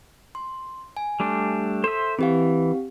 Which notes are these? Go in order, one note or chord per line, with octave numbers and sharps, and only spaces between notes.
C6
G#5
G3 A3 D4
A4 C5 E5
E3 C4 G4 F5